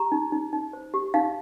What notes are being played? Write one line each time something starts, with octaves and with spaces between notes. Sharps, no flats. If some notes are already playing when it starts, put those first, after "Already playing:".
Already playing: G4 A#5
D#4
D#4
D#4
C5
G4
D#4 F5